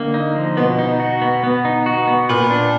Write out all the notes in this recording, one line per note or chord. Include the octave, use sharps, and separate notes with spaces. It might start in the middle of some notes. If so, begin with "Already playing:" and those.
Already playing: D3 D#3 A#3
D#4
F3
B2 B3
D#4
F#4
B3
B3
D#4
F#4
B3
A#2 B4
D4